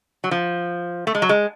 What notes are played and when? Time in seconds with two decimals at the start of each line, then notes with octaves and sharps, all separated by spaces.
0.24 F#3
0.31 F3
1.07 A3
1.15 G#3
1.22 F#3
1.29 G#3